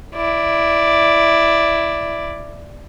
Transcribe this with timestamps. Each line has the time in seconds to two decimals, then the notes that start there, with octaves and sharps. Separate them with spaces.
0.16 E4 D5